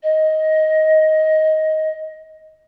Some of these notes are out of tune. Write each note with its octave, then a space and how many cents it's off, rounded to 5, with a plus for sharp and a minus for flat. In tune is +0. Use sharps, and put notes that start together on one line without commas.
D#5 +10